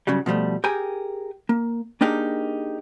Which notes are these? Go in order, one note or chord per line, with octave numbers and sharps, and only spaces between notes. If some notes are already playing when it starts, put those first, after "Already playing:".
G2 C#3 F#3 G3
B2 F3 G3 A3
G4 G#4 A#4 G5 G#5
A#3
A#3 D4 D#4 G4 G#4 A#4